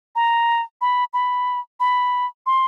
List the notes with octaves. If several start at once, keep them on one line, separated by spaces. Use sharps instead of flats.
A#5
B5
B5
B5
C6